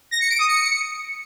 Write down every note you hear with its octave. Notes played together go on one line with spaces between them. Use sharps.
A#6
C#7
D7
D#6
C#7